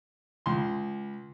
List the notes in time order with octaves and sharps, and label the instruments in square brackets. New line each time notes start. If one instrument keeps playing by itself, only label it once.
[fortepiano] C#2 C6